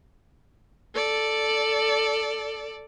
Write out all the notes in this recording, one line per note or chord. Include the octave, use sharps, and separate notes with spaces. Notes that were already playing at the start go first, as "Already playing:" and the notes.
A4 D5